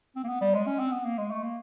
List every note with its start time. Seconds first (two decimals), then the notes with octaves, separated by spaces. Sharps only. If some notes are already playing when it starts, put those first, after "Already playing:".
0.16 C4
0.24 A#3
0.29 B3
0.41 G3
0.54 G#3
0.67 C#4
0.79 C4
0.92 B3
1.05 A#3
1.18 G#3
1.31 A3
1.43 A#3